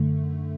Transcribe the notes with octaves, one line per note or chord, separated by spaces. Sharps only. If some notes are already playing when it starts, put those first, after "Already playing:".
Already playing: F#2 D3 A3